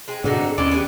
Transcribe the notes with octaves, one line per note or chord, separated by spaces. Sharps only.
G#3 C4 G#4
G#2 B2 D3 B3 D4 D#4 F#4 G#4
C4 D4
D#2 G#3 C#4 E4 D5 D#5
B3 G4 G#4